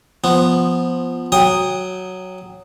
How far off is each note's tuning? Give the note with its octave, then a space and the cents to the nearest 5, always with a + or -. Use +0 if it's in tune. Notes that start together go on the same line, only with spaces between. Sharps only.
F3 +0 B3 +0
F#3 +0 G5 +30 D#6 +0